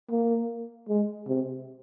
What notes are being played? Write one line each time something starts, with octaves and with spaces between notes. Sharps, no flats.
A#3
G#3
C3